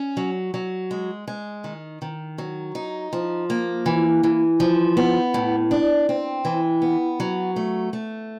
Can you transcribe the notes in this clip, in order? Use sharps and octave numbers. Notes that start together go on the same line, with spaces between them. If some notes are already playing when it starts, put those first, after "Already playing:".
Already playing: C#4
F#3
F#3
G#3
G#3
D#3
D#3
F#3
D#4
F3
A#3
E3
E3
F3
B3
A2
D4
C4
E3
B3
F#3
A3
A3